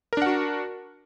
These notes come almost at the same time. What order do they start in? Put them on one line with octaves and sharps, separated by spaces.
A#4 D4 F#5 F#4